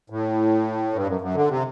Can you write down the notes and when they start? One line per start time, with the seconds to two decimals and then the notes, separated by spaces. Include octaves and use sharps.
0.10 A2
0.93 G2
1.07 F#2
1.21 F#2
1.35 D3
1.49 C3